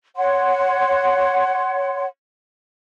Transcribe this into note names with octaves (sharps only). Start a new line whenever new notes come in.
C#5 F#5 C6